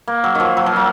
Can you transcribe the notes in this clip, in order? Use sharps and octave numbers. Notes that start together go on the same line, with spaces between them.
A#3
F#3
D#3 F3
F#3
F3
F#3